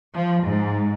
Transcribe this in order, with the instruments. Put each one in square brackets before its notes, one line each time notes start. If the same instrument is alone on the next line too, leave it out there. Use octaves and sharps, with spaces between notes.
[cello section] F3
G#2